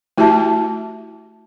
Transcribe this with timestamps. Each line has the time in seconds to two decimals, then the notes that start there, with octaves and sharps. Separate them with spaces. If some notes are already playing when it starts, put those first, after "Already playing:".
0.18 A3 E4 F#4 G4 E5 A5